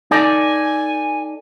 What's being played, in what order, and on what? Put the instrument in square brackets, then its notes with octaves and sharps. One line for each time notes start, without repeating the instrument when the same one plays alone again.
[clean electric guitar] D#4 A4 D5 [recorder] G#5